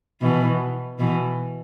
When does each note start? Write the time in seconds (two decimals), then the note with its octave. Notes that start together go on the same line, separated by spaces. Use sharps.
0.21 B2 E3
0.99 B2 E3